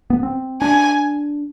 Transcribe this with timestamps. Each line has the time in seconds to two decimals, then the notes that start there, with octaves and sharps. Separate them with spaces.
0.10 B3
0.23 C4
0.62 D4 G#5